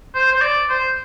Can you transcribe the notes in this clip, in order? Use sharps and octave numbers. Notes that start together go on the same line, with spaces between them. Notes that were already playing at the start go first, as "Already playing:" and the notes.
C5
C5
D5
C5